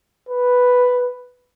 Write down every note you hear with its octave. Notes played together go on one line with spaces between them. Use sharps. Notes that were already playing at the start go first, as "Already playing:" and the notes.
B4